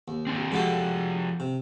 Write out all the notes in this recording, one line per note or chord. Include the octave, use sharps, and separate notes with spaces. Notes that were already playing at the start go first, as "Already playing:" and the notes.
D#2
C4 D4 G4
F3 G#3 F#4 G4 A4
C3